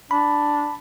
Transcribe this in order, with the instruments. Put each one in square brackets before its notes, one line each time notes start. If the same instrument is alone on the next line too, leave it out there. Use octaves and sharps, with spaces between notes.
[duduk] D4 [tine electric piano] B5